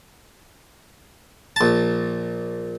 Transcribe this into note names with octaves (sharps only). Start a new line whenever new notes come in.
A#1 A5